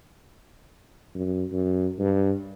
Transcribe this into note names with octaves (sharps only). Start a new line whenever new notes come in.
F#2
F#2
G2